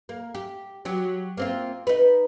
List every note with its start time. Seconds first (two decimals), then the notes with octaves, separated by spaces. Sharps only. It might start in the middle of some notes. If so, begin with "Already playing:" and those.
0.09 A#3
0.35 G4
0.85 F#3 G4
1.37 A#3 C4 F4
1.87 D#4 B4